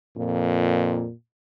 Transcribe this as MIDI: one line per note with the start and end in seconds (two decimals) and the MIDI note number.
0.17 1.06 41
0.17 1.11 46